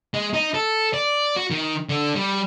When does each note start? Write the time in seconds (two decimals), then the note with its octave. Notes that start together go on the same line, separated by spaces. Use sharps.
0.14 G#3
0.34 D#4
0.54 A4
0.94 D5
1.36 F#4
1.51 D#3
1.89 D3
2.15 G3